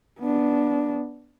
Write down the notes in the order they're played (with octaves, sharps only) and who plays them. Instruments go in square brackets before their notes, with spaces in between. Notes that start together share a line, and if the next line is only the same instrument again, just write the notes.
[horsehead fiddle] B3 D4